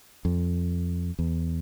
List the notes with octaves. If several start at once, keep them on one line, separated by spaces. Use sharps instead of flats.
F2
E2